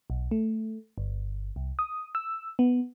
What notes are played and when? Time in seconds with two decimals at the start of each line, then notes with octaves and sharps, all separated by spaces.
0.10 B1
0.31 A3
0.98 G1
1.56 C2
1.79 D#6
2.15 E6
2.59 B3